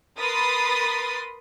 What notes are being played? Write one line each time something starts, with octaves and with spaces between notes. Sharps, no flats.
A#4 B4 B5 C6 D#6 A6